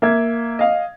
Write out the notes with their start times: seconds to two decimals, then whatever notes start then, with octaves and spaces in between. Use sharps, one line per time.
0.02 A#3 E5 G#6
0.59 D#5 F5